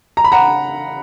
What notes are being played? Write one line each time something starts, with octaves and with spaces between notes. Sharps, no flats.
A#5
B5
F#5 A#5